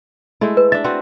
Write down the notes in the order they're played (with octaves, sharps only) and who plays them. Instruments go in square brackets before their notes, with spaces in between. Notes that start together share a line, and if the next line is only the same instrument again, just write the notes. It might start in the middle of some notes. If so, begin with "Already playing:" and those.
[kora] G#3 A3 E4
[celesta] B4
[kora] D4 E5 [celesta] A6
[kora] C4 F#4 B4